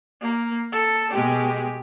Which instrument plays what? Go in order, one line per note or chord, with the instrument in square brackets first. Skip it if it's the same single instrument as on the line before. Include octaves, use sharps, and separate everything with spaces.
[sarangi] A#3
A4
[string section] B2 G#3 [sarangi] G4